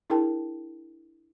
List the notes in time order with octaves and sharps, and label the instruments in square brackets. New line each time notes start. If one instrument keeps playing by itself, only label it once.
[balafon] D4 E4 G#4 A#4 G5 A5